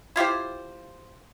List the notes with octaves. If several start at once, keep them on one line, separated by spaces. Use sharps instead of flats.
E4 F4 G4 C5